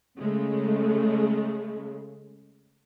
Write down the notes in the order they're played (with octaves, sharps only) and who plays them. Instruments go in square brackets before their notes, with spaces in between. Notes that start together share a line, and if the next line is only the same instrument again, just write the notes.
[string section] C#3 G#3 A3